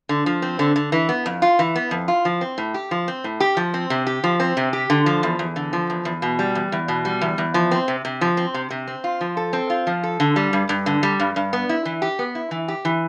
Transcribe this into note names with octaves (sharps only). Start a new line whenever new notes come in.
D3
F3
C4
D3
D3
E3
B3
F2
F4
E3
B3
F2
F4
F3
C4
A2
G4
F3
C4
A2
G4
F3
C4
C3
G4
F3
C4
C3
G4
D3
F3
E2
E2
D3
F3
E2
E2
B2
G3
E2
E2
B2
G3
E2
E2
F3
C4
C3
C3
F3
C4
C3
C3
C4
F4
F3
A4
C4
F4
F3
A4
D3
G3
G2
G2
D3
G3
G2
G2
B3
E4
E3
G4
B3
E4
E3
G4
E3